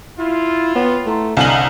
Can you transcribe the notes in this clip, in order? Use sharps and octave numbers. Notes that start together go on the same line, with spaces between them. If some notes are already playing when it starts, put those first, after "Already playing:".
E4 F4
B3 C#5 F#5 G5
A3 E4 A#5 C6
C2 D3 D5 D#5 F5 G#5 A#5 F#7